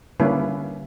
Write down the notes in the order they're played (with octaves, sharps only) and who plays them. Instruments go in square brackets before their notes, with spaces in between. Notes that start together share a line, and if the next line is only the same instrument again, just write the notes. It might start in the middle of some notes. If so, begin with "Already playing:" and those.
[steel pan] D3 G3 A#3 C#4 E4 B4